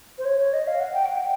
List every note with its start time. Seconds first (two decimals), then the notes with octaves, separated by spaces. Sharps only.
0.18 C5
0.25 C#5
0.38 C#5
0.53 D#5
0.67 F5
0.80 F#5
0.93 G5
1.05 F#5
1.16 G5